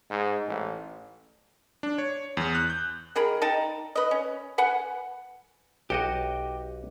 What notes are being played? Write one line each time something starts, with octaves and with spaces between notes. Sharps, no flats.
G#2
A1
D4
C#5
E2
F#6
G6
D#3 G#4 A#4 B5
D#4 G5 A5 A#5
B4 D#5
C#4
B4 F#5 G#5
B1 F#4 G4 D#5